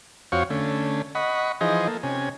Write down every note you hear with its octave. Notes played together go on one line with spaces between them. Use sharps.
F2 C4 F#4 C#5 F5 C#6
D3 A3 C#4
D#5 F#5 B5 C#6
E3 F3 D#4 G#4 C5 D#5
A#3 A4
C3 C#4 G#5